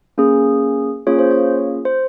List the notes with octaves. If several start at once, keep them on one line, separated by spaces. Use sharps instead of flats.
A#3 C#4 G#4
A#3 C#4 F4 G#4 C#5
C5
C#5
C5